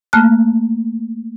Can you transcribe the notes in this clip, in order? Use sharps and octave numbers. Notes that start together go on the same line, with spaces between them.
A3 A#3 A5 F6 F#6